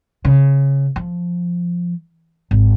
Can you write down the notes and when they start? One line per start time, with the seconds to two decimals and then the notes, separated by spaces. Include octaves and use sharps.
0.25 C#3
0.96 F3
2.51 G#1